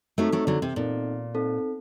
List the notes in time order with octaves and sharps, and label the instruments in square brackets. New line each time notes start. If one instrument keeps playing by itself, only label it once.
[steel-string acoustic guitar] F#3 A3 [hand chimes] C4 D#4 A4
[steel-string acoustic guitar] F#3 A3
D3 F#3
C3
[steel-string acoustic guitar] A#2 [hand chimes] C4 D#4 A4
[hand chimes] C4 D#4 A4